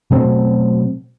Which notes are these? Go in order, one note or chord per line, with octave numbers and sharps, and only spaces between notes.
B2 F#3 A3 C4